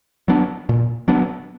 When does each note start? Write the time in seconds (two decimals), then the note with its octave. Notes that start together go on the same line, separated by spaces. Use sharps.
0.28 F#3 B3 D4
0.69 A#2
1.08 F#3 B3 D4